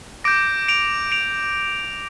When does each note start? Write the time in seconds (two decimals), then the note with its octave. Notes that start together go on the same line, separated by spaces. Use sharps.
0.24 D6 G6 A#6 D7
0.68 D7 F7
1.12 D7 F7